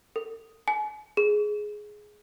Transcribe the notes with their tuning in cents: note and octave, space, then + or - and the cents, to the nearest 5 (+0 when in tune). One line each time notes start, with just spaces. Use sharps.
A4 +40
G#5 +35
G#4 +10